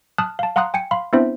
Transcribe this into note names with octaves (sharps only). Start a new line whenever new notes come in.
A5 D#6 F6 F#6
F5 A5
F5 F#5 A#5 C6 D#6 F#6
G5 G#5 C#7
F5 B5 C6
B3 C4 D4 E4 C5 E5